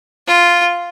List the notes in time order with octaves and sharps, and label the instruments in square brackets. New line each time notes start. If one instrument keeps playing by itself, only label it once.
[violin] F4